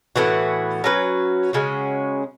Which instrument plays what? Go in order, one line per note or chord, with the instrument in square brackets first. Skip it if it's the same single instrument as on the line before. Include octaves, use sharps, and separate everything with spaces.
[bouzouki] A2 E3 B3 F#4
F#3 C#4 F#4 B4
C#3 G#3 C#4 F#4